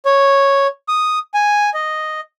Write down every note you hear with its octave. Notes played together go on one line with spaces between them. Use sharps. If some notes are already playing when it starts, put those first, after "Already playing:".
C#5
D#6
G#5
D#5